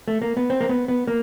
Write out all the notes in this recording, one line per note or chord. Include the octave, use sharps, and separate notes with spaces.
A3
A#3
B3
C4
A#3
B3
B3
A#3